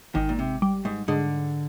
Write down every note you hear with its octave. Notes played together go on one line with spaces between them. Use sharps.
G#1 D#3
A#2
C3
G3
G#2
G#2 D3